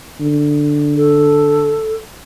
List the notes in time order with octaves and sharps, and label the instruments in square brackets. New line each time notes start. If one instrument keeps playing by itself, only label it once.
[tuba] D3
[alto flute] A4